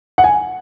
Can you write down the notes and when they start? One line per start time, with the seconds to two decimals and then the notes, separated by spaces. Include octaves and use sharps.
0.18 F#5
0.24 G#5